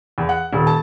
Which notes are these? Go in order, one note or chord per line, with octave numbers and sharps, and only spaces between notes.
E2
F#5
D#1
A5